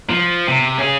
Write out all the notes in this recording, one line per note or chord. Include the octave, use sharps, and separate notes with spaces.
F3
C3
C#4 G#4